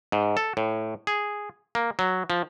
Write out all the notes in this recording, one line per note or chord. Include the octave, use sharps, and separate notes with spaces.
G#2
A4
A2
G#4
A#3
F#3
F3